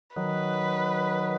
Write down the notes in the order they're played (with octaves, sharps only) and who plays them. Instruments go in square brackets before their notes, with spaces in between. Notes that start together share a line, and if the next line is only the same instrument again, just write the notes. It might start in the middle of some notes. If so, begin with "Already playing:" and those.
[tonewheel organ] D#3 F#3 [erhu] B4